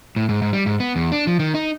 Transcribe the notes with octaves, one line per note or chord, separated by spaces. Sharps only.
A2
G#2
G#2
G3
G#2
B3
E2
D4
F3
D#3
D#4